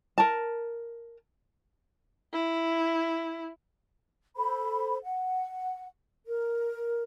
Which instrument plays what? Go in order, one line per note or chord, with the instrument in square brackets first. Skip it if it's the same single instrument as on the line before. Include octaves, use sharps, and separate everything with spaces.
[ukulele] A#4 A5
[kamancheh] E4
[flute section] A4 C5 B5
F#5
A#4